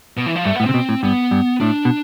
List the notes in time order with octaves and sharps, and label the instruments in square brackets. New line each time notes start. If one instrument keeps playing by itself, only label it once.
[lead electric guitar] B2
E3
F3
[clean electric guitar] G2 [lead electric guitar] A3
[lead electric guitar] B3
[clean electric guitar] A2
[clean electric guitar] C3 [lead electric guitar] C4
[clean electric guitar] B2
A2
[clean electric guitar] G2 [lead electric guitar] B3
[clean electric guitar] G2
[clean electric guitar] A2 [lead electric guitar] D4
[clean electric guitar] B2